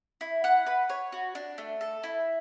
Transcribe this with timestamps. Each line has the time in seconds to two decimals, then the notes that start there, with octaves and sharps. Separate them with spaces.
0.21 E4
0.44 F#5
0.66 B4
0.89 C#5
1.12 F#4
1.35 D4
1.58 A3
1.81 A4
2.03 E4